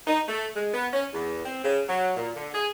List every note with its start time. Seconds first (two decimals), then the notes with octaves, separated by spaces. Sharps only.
0.06 D#4
0.28 A3
0.55 G#3
0.74 B3
0.92 C#4
1.13 E2
1.45 C4
1.64 C#3
1.88 F#3
2.17 A#2
2.35 D3
2.54 G#4